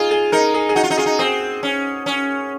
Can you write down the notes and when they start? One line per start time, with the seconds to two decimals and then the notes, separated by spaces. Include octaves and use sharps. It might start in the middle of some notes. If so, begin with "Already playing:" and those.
Already playing: D#4 F4 G#4
0.11 G#4
0.32 D#4 A#4
0.54 G#4
0.69 G#4
0.75 D#4 F#4
0.83 F4
0.90 D#4
0.97 F4 G#4
1.06 D#4
1.19 C4 G#4
1.63 C#4
2.06 C#4